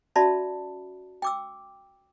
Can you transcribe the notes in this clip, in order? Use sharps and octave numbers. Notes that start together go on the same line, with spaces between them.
C#4 F#4 D5 E5 A5 B5
G5 D6 E6